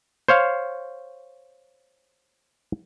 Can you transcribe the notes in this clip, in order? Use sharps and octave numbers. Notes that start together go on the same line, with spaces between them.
C5 C#5 F5